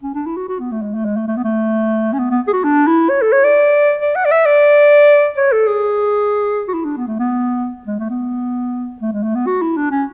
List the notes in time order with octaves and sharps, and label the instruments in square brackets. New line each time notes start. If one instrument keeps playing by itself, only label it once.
[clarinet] C#4
D4
E4
F#4
F#4
B3
A3
G#3
A3
G#3
A3
A3
B3
A3
C#4
B3
B3
G#4
F#4
D4
E4
C#5
A4
C#5
D5
D5
F#5
D5
E5
D5
C#5
A4
G#4
F#4
E4
D4
B3
A3
B3
G#3
A3
B3
A3
G#3
A3
B3
F#4
E4
D4
C#4